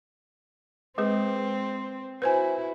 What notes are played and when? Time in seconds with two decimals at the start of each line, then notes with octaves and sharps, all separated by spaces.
0.98 G#3 C4 G#4 B4
2.22 E4 F#4 B4 C5 G#5